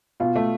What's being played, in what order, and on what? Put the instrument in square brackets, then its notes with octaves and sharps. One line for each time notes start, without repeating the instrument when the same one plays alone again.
[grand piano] B2 [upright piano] F4
[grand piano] A3